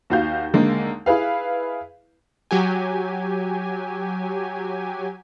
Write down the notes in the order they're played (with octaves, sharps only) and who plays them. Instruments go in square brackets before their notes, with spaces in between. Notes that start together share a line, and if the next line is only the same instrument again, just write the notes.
[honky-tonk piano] D#2 F#4 F5 G6
D#2 D3 G#3 A#3
E4 G#4 B4 F5
[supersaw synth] F#3 G4 G#5